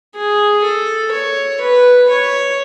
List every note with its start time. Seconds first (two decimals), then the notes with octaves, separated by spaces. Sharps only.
0.16 G#4
0.64 A4
1.12 C#5
1.61 B4
2.09 C#5